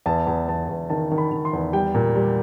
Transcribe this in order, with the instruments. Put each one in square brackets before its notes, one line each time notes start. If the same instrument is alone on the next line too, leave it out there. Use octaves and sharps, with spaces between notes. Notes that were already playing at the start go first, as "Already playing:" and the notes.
[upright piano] E2 A5
E2
E2 A5
E2
D#3 A5
D#3
B5
D#3
C6
E2
G3 G5
A#2
G3